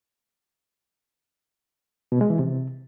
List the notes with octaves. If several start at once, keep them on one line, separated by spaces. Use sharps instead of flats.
B2
G#3
E3
C3